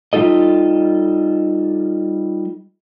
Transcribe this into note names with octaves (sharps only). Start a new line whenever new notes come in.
G3 D#4 F4 A4 D#5